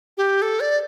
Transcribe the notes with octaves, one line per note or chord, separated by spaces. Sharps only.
G4
A4
D5